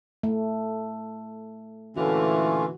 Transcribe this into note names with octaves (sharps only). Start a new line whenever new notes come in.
A3
A#2 D3 E3 A3 C#4 F4 F#4